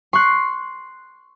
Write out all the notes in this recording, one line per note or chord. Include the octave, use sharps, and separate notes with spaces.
C6 C#6 F#6